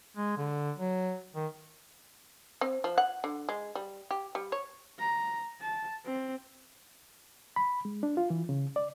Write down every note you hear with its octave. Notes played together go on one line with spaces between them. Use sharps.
G#3
D3
F#3
D#3
C4
F3
F#5
D3
G#3
G3
G4
G3
C#5
A#5
A5
C4
B5
G#3
D4
F4
E3
C#3
D5